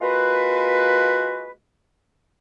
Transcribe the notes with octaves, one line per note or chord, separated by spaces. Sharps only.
G#3 A#3 F4 F#4 B4